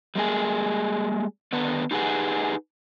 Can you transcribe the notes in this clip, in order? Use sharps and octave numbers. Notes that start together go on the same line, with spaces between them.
G3 G#3 A#3 G#4
D3 D#3 B3 B4
D#4 G4 G#4 B4 F#5